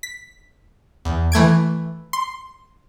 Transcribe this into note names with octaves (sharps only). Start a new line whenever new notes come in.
B6
E2
E3 A3 G#6 D7
C6